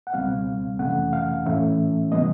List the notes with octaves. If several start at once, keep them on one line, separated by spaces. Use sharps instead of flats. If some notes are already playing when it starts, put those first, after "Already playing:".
F#5
C#2 B2 G3 C4 F5
F2 C3 E3 A3 C#4 F#5
F5
A2 E3 A3 C#4 E5
C3 E3 G3 B3 D#5